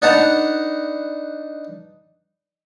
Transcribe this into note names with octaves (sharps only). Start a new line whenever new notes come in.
D4 D#4 B4 F#5 A5 A#5